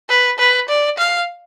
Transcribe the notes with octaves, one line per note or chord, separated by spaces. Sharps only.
B4
B4
D5
F5